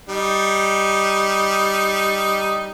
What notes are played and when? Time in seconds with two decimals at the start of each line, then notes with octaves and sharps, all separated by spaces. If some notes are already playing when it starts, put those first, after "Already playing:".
0.09 G3 D#4